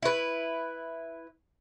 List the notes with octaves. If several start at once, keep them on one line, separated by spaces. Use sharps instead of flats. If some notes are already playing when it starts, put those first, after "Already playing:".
E4 B4